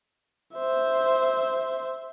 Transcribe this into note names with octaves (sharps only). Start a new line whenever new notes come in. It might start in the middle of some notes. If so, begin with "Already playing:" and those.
C5 E5